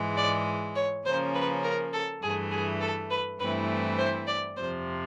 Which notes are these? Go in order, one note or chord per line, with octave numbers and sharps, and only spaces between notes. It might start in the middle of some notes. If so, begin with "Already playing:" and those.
Already playing: G#2 E3 G#3
D5
C#5
C#3 F3 A#3 C#4 C5
B4
A#4
A4
G2 E3 A3 G#4
G#4
A4
B4
G2 E3 A3 C4 E4 B4
C5
D5
F2 C3 F3 C5